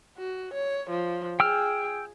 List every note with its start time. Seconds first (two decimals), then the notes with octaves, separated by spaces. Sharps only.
0.18 F#4
0.54 C#5
0.90 F3
1.40 G#4 G5 E6 F6